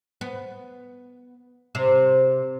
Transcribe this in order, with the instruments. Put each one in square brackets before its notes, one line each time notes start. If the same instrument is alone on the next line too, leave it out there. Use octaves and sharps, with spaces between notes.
[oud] B3
C3